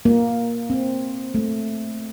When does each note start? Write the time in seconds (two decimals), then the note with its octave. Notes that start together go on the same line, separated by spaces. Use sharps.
0.05 A#3
0.70 C4
1.34 A3